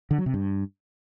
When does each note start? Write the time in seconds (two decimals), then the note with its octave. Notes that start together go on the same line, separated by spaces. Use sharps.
0.11 D3
0.18 F#3
0.26 C3
0.34 G2